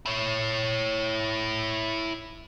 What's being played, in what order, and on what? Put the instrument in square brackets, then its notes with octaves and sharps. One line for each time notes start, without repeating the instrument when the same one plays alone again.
[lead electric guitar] E4 C#5